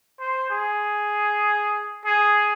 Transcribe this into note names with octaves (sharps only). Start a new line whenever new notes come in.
C5
G#4
G#4